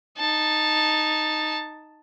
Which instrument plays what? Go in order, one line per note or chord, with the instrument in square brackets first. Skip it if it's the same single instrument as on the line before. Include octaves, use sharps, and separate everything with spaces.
[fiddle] D#4 A5